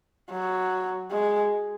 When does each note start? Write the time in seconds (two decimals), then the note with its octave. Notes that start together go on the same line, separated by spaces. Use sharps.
0.32 F#3
1.12 G#3